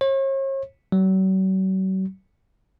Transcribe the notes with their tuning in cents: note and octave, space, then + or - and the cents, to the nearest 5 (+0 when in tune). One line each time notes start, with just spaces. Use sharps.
C#5 -40
F#3 +40